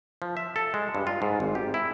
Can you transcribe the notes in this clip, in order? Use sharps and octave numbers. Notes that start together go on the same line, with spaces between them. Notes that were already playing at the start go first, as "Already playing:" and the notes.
F3
E5
A4
G#3
G2
F4
G#2
G#1
G4
E4